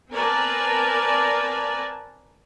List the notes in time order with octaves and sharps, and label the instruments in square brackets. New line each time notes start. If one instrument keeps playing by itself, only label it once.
[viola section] C4 A#4 B4 D5 G#5 A5